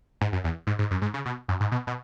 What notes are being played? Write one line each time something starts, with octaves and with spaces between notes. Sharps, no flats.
G#2
F#2
E2
G#2
G#2
F#2
G#2
C#3
B2
F#2
G#2
B2
B2